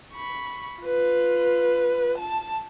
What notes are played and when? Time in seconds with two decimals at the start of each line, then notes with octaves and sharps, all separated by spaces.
0.13 B5 C#6
0.82 F4 B4
2.18 A5